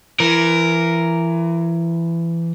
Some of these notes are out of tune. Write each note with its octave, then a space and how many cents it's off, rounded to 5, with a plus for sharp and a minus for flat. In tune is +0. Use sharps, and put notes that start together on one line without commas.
E3 +25 A#4 +0